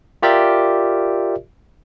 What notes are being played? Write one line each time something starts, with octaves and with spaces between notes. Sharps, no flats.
F4 G4 A#4 D5 E5